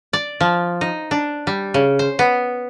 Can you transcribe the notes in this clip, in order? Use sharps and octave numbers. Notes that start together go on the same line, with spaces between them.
D5
F3
D#4
D4
G3
C#3
C5
B3